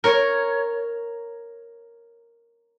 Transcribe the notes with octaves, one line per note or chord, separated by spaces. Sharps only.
A#4 C#5